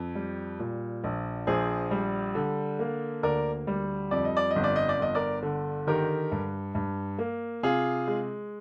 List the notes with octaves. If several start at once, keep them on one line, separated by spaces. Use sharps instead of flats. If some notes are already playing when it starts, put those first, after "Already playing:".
Already playing: F2
G3
A#2
A#1
A#1 G#4 C5
G3
D3
A#3
D2 A#4 D5
G3
F2 D5
D#5
D5
D#5
G1
D5
D#5
D5
G1 D#5
A#4 D5
D3
D#3 G4 A#4
G2
G2
A#3
C3 F4 G#4
G#3